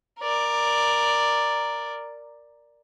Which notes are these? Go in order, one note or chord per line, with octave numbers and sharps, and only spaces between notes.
A#4 D5